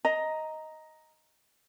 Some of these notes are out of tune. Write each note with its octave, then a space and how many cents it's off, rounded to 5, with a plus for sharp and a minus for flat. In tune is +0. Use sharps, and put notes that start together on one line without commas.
D#5 +10 A#5 +0